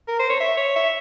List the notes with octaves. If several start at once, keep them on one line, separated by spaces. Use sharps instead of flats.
A#4
C5
C#5
E5
C#5
E5